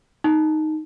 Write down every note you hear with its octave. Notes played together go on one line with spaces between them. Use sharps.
D#4